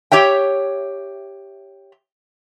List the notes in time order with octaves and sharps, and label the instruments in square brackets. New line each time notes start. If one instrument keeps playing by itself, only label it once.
[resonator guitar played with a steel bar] G4 C#5 E5 G5